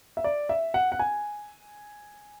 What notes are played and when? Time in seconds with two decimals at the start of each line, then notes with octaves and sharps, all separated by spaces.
0.17 E5
0.24 D5
0.49 E5
0.74 F#5
0.92 F#5
0.99 G#5